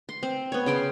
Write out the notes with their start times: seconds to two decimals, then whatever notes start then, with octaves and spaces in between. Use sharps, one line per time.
0.09 C6
0.23 C4
0.52 B3 C#5
0.66 C#3 G5 C6